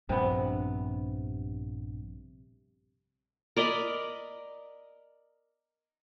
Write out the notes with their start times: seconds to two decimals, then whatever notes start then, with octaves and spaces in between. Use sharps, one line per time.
0.09 A#1 G2 C3 B3
3.57 A#4 D5 D#5 B5